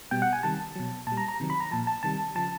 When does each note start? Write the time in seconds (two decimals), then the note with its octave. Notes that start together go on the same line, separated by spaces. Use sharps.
0.11 B2 G3 G5
0.22 F#5
0.33 G#5
0.43 C3 D#3 G3 A5
0.75 B2 F#3
1.07 A#2 A5
1.12 G3
1.17 A#5
1.28 A#5
1.40 C3 D#3 F#3
1.50 B5
1.60 A#5
1.71 A#2 F3 A5
1.87 A5
2.03 C3 D#3 G3 A5
2.35 C#3 F3 A5